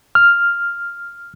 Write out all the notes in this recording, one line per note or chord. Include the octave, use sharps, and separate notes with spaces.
F6